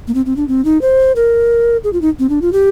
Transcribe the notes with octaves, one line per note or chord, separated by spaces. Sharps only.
A#3
C4
C4
D4
C4
D#4
C5
A#4
G#4
F4
D#4
C4
D4
F4
G4